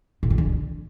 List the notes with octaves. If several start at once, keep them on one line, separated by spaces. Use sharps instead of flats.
A#2
G2
D3